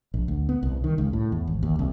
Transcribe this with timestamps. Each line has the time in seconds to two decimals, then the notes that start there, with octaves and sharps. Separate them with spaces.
0.14 A#1
0.28 D2
0.49 B3
0.63 C2
0.84 D#3
0.98 C#2
1.13 A2
1.32 E2
1.47 G#1
1.63 D#2
1.79 C2